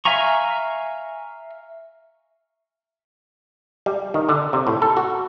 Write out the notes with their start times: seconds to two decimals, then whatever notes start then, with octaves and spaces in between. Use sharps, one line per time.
0.05 E5 F5 G#5 A#5 C#6
3.86 G3
4.14 D#3
4.29 D3
4.53 C3
4.67 A2
4.82 A4
4.97 F#4